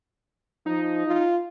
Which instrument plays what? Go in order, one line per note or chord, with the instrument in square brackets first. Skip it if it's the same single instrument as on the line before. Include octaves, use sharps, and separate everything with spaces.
[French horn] F3 [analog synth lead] D#4
[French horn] F4